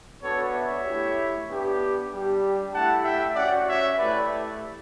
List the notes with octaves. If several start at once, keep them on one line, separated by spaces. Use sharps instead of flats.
B3 D4 F#4 A4 C#5
C#5 E5
A3 E4 G4
B3 D4 G4
G3 D4 G4
A3 E4 G4 F#5 A5
E5 G5
C#4 F#4 D5 F#5
C#5 E5
A3 E4 G4 B4 D5